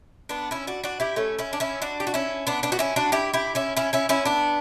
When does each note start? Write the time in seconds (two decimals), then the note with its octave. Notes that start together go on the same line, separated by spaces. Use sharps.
0.29 B3 D4
0.51 C#4 E4
0.67 D4 F#4
0.84 D4 F#4
1.00 E4 G4
1.16 A3 C#4
1.39 C#4 E4
1.53 D4
1.60 C#4 E4
1.82 D4 F#4
2.00 G4
2.07 F#4
2.14 C#4 E4
2.47 B3 D4
2.63 B3 D4
2.72 F#4
2.79 C#4 E4
2.96 D4 F#4
3.12 E4 G4
3.34 E4 G4
3.55 C#4 E4
3.77 C#4 E4
3.93 C#4 E4
4.09 C#4 E4
4.25 B3 D4